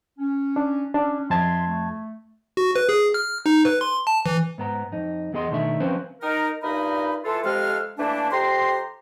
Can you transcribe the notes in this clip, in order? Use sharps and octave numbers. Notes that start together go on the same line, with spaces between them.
C#4
D4
C#4 D4
F2 E5 A5 C6 G#6
A3
F#4
B4
G#4
F6
D#4
B4
C6
A5
E3
G#2 B3 A#5
F2 D#4
E2 B3 G#4 D#5 C6
B2 D#3 A3 D4 E5
F3 C4 C#4 F4 B4 C5
D#4 A#4
G2 A#2 D#4 A#4 D#5 B5
E3 F4 A4
F2 C3 G#3 A4 F5 F6
E3 A3 A#3 D4
F2 G4 A#5 C6